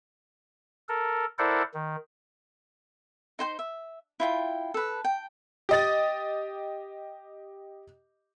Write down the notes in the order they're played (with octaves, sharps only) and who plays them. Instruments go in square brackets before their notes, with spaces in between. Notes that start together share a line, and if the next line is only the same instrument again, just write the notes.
[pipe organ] A4 A#4
E4 A4 A#4 C5 D5 F#5
D#3
[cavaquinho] D#4 C5 G5 C6
E5
E4 F4 G5
A4 B4
G5
[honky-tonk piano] G4 D#5 A6